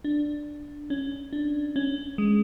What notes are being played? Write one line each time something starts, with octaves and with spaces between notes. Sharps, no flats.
D4
C#4
D4
C#4
G#3